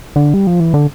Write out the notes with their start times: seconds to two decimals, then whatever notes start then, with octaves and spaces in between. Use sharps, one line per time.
0.16 D3
0.34 G3
0.47 F3
0.60 E3
0.74 D3